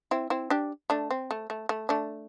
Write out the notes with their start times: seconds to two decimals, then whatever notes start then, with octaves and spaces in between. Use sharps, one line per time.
0.11 C4 E4
0.30 C4 E4
0.50 D4 G4
0.90 A3 D4
1.10 C4
1.31 A3
1.50 A3
1.69 A3
1.89 A3 D4